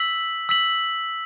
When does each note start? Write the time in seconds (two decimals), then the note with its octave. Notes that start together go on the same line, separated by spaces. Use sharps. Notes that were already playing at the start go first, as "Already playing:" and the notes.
Already playing: E6 B6 F#7
0.49 E6 B6 F#7